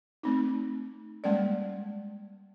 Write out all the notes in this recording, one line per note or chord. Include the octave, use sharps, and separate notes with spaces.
A3 C4 D#4
G3 G#3 A#3 C#4 D5